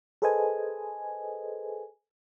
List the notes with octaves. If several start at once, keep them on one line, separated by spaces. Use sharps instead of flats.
G#4 A4 B4 C5 D#5 G#5